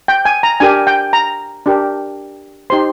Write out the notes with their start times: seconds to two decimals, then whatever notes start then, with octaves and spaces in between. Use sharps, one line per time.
0.08 G5
0.25 G#5
0.43 A#5
0.60 D4 G4 A#4 G#5
0.87 G5
1.13 A#5
1.66 D4 G4 A#4
2.70 D#4 G4 C5 C6